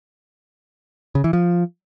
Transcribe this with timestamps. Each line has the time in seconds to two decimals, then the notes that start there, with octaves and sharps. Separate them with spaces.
1.15 C#3
1.24 E3
1.33 F3